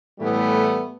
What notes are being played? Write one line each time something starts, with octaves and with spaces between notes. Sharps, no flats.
A2 E3 G3 A3 B3